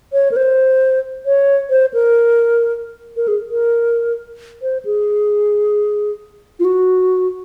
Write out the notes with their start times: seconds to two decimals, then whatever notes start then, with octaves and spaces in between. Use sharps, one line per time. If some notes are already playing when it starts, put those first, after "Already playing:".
0.13 C#5
0.32 A#4
0.36 C5
1.26 C#5
1.70 C5
1.94 A#4
3.17 A#4
3.28 G#4
3.50 A#4
4.62 C5
4.85 G#4
6.60 F4
6.65 F#4